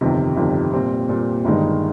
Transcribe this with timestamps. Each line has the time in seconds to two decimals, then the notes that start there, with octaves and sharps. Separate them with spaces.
0.01 G1 F2 C3 D#3
0.36 G1 F2 C3 D#3
0.73 A#2 G3 C4
1.09 A#2 G3 C4
1.45 G1 G2 D#3 G#3 D#4